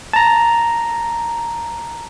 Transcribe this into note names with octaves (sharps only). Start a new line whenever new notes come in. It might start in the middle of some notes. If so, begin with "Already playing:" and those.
A5 A#5